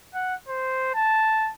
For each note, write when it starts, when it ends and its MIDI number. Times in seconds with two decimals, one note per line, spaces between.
0.14 0.35 78
0.48 0.92 72
0.95 1.51 81